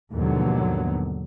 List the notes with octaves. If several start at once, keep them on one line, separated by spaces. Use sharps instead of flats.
D#2 G#2 B2 D3 F3 F#3